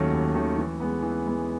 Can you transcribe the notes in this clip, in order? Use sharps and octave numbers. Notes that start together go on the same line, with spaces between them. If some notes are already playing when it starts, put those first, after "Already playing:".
Already playing: D#2 D#3 F#3 A3 C#4
D#2
D#3 F#3 A3 C#4
E3
G#3 B3
E3
G#3 B3